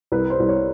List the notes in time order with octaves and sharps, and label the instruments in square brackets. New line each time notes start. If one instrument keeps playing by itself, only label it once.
[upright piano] C2 B4
C5
C2
C#5